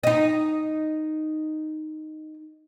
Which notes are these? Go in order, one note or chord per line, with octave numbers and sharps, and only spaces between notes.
D#4 D#5